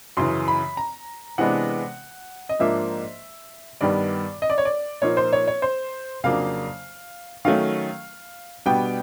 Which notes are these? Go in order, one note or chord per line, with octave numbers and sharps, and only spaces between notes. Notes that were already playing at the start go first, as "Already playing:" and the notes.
F#2 C#3 E3 C6
B5
A#5
C3 E3 G#3 B3 D4 F#5
D#5
G#2 F3 A#3 D4 E5
G2 D#3 G3 B3 D5
D#5
D5
C#5
D5
A#2 F3 A#3 D#4 C#5
C5
C#5
C#5
C5
F2 C#3 F#3 A#3 D4 F5
D#3 F#3 A3 C#4 F5
B2 G3 B3 D4 G5